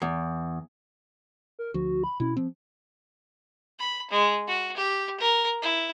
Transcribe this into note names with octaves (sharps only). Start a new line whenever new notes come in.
E2
A#4
D2 F3 F#4
B5
B2 C#4 E4
F3 C4
B5
G#3
F#4
G4
A#4
E4